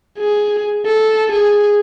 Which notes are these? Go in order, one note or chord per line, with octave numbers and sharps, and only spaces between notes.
G#4
A4
G#4